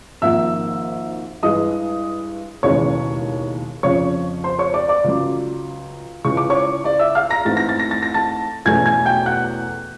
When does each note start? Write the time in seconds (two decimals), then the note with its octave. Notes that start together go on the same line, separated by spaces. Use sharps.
0.22 G#1 G#2 F3 A#3 E5 E6
1.43 G2 E3 G#3 D#5 D#6
2.63 E1 D#2 C#3 E3 G#3 C#5 C#6
3.83 F2 C#3 F3 C#5 C#6
4.44 C5 C6
4.59 C#5 C#6
4.74 D5 D6
4.89 D5 D6
5.04 C#2 C#3 F#3
6.24 C#2 C#3 E3 G#3 C#4 C#6
6.37 D6
6.50 C#5 C#6
6.84 D5 D6
6.99 E5 E6
7.15 F5 F6
7.30 A#5 A#6
7.45 G#2 E3 A3 C4 A6
7.57 A#6
7.69 A6
7.79 A#6
7.91 A6
8.03 A#6
8.14 A5 A6
8.65 E2 B2 F#3 A3 C#4 G#5 G#6
8.86 G#5 G#6
9.05 G5 G6
9.26 F#5 F#6